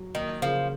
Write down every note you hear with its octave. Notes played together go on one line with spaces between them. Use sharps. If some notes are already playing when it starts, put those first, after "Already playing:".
Already playing: F#3
D#3 A#3
C#3 F3